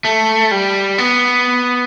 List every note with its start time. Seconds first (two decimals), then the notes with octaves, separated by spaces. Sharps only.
0.05 A3
0.51 G3
0.98 B3